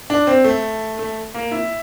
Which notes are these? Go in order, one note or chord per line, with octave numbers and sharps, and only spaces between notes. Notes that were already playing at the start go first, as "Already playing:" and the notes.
D4
C4
A3
A3
A#3
E4